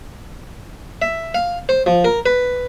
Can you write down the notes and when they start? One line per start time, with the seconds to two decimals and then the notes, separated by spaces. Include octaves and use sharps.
1.02 E5
1.34 F5
1.69 C5
1.86 F3
2.05 A#4
2.26 B4